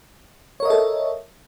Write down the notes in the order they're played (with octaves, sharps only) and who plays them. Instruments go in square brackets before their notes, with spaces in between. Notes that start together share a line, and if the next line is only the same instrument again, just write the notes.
[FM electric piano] C#5
A#4
D#5
E5
A4